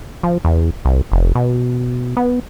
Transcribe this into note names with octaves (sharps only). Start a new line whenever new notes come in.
F3
E2
C2
F1
B2
B3